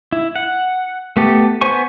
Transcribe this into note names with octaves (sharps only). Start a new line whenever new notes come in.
E4
F#5
A3 B3 G4 A4
B3 C5 G#5 C#6